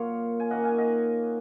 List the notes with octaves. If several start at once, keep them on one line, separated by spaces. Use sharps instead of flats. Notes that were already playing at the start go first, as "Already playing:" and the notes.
Already playing: A#2 F#3 A#3 C#5 F5
G#5
D#3 A#3 C#4 D#5 F#5
F5 G#5
D#5 F#5